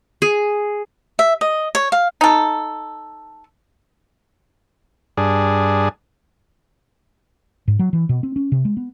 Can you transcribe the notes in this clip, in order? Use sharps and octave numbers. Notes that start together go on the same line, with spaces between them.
G#4
E5
D#5
C#5
F5
D#4 A4
G2 D4 G#4
G#2
F#3
E3
B2
C4
C#4
C3
G#3
B3